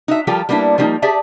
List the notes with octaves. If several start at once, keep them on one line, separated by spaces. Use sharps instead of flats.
D#4 F#4 E5
F3 G3 F4 G4 A4 A#4
G3 A#3 B3 D4 E4
F3 G3 A#3 C4 D#4
G4 G#4 D5 E5 A5